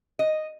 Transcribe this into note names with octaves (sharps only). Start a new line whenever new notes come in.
D#5